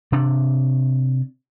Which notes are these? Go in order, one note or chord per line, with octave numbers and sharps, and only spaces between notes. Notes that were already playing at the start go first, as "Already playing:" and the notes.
C3 D4